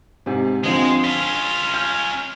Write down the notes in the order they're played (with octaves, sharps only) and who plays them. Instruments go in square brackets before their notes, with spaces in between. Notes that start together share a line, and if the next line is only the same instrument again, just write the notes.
[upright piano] G#2 C3
[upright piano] D3 F3 C4 [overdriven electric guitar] G#3
[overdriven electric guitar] C#4 F4 [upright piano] B6
[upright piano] F6 G6